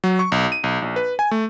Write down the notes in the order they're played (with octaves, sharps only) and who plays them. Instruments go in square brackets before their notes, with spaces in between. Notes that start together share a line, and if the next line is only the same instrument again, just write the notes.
[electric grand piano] F#3
C#6
B1
D#7
B1
A#1
B4
G#5
A3